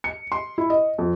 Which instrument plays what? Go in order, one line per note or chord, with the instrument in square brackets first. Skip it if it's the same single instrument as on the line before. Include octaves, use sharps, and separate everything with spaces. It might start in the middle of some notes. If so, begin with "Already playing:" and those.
[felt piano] C#7
C6
E4
D#5
F2